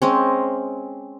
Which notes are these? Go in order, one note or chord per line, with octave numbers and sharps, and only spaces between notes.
G#3 C4 C#4